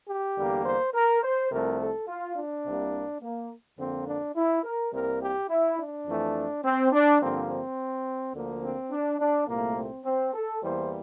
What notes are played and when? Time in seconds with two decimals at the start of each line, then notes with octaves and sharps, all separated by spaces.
0.08 G4
0.37 E2 D3 G3 A#3
0.66 C5
0.94 A#4
1.23 C5
1.51 C2 C3 F3 A3 A#4
1.79 A4
2.08 F4
2.36 D4
2.65 C2 C3 G3 A#3
3.22 A#3
3.78 F2 D3 F3 A#3 C4
4.07 D4
4.36 E4
4.64 A#4
4.92 C2 C3 G3 A#3 A#4
5.22 G4
5.50 E4
5.78 D4
6.07 F2 E3 A3
6.64 C4
6.92 D4
7.21 G2 D3 F3 A#3 C4
7.49 C4
8.34 D2 D3 F3 A#3
8.62 C4
8.91 D4
9.19 D4
9.48 C2 A#2 A3 A#3
9.76 C4
10.05 C4
10.34 A4
10.62 E2 E3 G3 A#3 C5